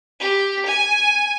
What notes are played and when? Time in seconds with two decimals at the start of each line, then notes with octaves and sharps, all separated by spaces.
0.20 G4
0.66 G#5